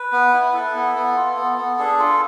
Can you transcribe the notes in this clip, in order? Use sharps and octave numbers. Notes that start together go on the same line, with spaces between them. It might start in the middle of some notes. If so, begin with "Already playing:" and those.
Already playing: B4
B3
E4
E4 A4
B3
B3
F4
B3
B3
D4 G#4
F4 A4